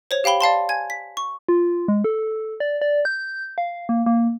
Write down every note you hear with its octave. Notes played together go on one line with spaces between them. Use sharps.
C5 C#5 F7
G4 F5 G5 B5 G7
D5 F5 A5 C6
G#5 G#6
B6
C#6
F4
G#3
A4
D5
D5
G6
F5
A#3
A#3